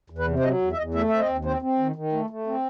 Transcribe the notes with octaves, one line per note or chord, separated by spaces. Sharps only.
E2
B4
C3
C5
F#3 D#5
E2
E5
E2 D#5
A3 E5
C4 E5
D#5
D#2
C4 C5
C4
D#3
D#3
A3
A3
C4